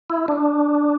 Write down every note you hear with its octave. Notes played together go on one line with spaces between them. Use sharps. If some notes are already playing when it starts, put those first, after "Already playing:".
E4
D4